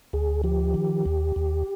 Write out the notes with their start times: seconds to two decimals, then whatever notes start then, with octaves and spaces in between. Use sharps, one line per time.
0.13 D2 G#4
0.44 F3 G4
0.74 D#3
1.06 D#2
1.36 D#2